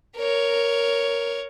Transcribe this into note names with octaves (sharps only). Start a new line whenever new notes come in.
A#4 C#5